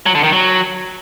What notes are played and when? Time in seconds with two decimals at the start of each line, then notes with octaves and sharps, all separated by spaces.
0.06 F#3
0.15 D3
0.24 D#3
0.32 F#3